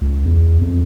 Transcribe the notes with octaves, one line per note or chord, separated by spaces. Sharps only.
C#2
E2
F2